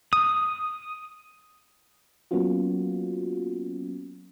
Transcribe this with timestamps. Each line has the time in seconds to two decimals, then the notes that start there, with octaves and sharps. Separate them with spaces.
0.13 D#6
2.31 F#3 A#3 B3 C#4 F4 F#4